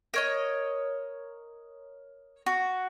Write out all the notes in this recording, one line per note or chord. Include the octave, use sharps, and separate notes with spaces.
A#4 C#5 D#5
F#4